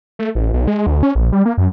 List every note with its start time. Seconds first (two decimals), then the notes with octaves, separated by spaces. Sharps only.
0.19 A3
0.35 A1
0.53 B1
0.67 G#3
0.87 D2
1.03 C#4
1.15 A#1
1.32 G3
1.46 A#3
1.58 F#2